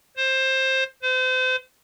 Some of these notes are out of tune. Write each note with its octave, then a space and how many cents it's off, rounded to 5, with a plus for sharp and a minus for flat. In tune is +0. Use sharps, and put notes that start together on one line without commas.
C5 +15
C5 -35